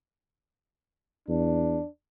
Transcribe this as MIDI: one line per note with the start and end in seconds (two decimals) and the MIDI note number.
1.28 1.79 40
1.28 1.88 62